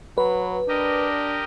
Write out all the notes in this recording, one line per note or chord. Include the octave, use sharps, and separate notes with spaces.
F#3 B4
D4 G4 A#4 D#5